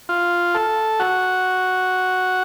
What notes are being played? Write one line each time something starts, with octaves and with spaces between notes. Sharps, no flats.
F4
A4
F#4